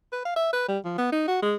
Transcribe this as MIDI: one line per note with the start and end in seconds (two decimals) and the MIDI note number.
0.12 0.21 71
0.25 0.33 77
0.36 0.51 76
0.53 0.66 71
0.68 0.78 55
0.85 0.98 53
0.98 1.09 59
1.12 1.26 63
1.28 1.42 66
1.42 1.55 56